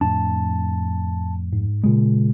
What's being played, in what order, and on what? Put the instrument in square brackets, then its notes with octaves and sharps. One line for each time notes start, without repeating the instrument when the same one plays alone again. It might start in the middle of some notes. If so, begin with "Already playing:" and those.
[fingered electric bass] F2 A2 D4 [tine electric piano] A5
[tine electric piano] G#2
[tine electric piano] A#2 C#3 [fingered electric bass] G#3